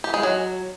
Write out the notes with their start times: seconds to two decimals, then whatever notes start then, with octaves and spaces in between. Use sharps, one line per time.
0.04 G4
0.14 G#3
0.23 F#3